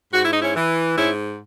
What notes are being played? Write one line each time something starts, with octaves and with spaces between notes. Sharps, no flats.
G#2 F#4
E4
D#4
C#4 E4
E3
G#2 C#4 E4